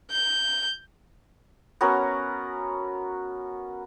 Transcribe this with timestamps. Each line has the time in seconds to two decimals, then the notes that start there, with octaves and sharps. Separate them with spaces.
0.11 G6
1.81 B3 C#4 F#4 A#4